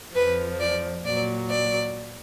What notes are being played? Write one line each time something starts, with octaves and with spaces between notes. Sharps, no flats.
F2 F3 B4
D5
A#2 F#3 D5
D5